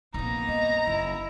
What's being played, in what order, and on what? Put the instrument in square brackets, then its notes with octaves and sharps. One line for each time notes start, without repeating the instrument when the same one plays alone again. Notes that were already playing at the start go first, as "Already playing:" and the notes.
[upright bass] A#1 C3 [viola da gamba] A#3 B3 D#4 [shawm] A#5
[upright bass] C#4 [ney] D#5
[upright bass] F#1 [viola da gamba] E4